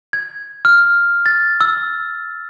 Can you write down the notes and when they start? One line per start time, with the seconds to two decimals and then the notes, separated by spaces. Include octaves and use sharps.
0.13 G#6
0.65 F6
1.26 A6
1.61 E6